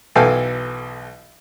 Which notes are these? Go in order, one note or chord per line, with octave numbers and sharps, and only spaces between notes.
B1 E3 A4 F5 G5 G#5